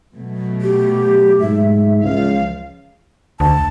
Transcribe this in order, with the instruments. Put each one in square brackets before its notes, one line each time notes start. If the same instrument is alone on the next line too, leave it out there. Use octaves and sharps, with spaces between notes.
[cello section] B2 F#3 A3
[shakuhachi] G4
[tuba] G#2 [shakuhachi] E5
[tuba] C#2 [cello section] F3 F5
[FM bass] D2 [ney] A5